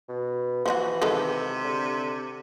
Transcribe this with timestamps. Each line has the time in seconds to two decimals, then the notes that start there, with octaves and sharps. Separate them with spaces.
0.08 B2
0.66 E3 F3 C4 F#4
1.02 C3 D#3 G#3 A4
1.64 D3